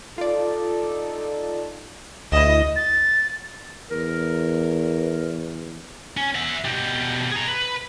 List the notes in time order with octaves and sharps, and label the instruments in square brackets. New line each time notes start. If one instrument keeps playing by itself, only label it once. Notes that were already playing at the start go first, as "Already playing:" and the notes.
[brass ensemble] D#4 A4 [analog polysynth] F4 D5
[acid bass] D2 [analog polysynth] E4 E7 [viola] D#5
[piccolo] A6
[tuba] E2 [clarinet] A#4
[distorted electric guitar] C#4
E5 F#5
B2 G3
G#4 A#5
B4